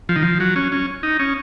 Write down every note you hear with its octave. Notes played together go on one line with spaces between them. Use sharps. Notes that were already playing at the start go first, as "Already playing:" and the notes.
F3
D#3
F3
F#3
C#4
C#4
D#4
C#4